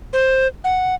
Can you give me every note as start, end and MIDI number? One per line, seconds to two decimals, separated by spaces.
0.13 0.47 72
0.64 0.95 78